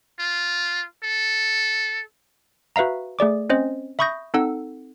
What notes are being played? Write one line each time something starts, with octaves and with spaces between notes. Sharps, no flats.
F4
A4
F#4 B4 E5 F5 A#5
A3 G#4 D5 D6
C4 C#4 C5 D#5
E5 B5 C#6 D#6 G6 A#6
C4 D#4 A4 F#5 E6